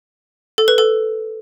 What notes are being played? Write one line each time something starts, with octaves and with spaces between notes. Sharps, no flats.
A4
B4
A4